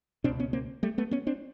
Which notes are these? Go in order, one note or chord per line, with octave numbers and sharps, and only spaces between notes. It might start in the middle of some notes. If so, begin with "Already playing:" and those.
C#2 B2 C4 D4
B3 C#4
A#3 C4
G3 A3
A3 B3
B3 C#4
C4 D4